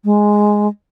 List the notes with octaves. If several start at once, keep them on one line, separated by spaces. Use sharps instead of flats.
G#3